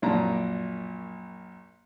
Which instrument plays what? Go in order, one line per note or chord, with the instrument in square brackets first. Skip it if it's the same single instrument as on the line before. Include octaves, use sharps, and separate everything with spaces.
[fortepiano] A#1 F#2 A#2 D5 A5 A#5